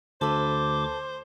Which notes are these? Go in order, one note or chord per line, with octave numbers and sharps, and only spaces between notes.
D2 A4 B4 C5 D6